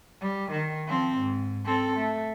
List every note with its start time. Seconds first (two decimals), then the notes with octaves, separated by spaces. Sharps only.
0.22 G3
0.51 D#3
0.88 F3 C4
1.18 G#2
1.65 C4 A4
1.97 A3